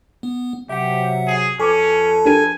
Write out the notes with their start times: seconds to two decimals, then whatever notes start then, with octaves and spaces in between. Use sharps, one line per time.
0.23 B3
0.69 C3 F#3 G4 E5 F#5
1.27 G#4
1.60 F2 C#4 A4 B4 G#5 A5 C#6 D6
2.26 D4 G4 A#4 G#5